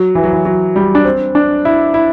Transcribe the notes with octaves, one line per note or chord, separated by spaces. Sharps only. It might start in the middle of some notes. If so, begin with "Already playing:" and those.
Already playing: F#3
E3
F#3
E3
F#3
G3
D4
C4
D4
E4
E4